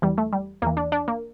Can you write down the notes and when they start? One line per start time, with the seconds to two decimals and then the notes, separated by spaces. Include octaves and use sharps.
0.02 E2 E3 G3
0.18 A3
0.33 G3
0.62 E2 A#3
0.66 E3
0.77 D4
0.92 D4
1.08 A#3